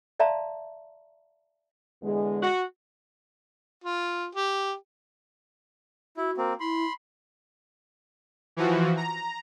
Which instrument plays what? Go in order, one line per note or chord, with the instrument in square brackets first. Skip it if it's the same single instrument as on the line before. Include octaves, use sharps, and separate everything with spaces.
[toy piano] D5 E5 F5 A5 A#5 C6
[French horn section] E2 D3 G#3
[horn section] F#4
[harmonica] F4
G4
[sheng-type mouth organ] E4 [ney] F#4
[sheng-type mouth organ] A#3 C4
[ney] E4 [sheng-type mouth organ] B5 C6
[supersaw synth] E3 F3 F#4
A#5